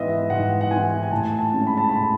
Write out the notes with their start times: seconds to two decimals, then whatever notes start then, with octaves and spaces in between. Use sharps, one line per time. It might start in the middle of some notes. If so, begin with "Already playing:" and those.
Already playing: G#2 E3 B3 D#5 E5
0.30 G#2 F#5
0.61 F#5
0.71 E3 B3 G#5
1.03 G#5
1.11 A2 A5
1.39 A5
1.53 G#3 C#4
1.67 B5
1.77 A5
1.89 A2 B5